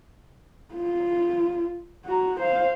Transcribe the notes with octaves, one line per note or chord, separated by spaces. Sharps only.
F4
F#4 A#5
C5 F5